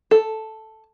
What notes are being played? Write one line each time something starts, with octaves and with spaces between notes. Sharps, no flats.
A4